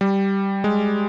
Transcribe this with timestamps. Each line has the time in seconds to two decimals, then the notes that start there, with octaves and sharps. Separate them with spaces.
0.01 G3
0.64 G#3